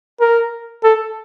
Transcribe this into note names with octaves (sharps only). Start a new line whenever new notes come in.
A#4
A4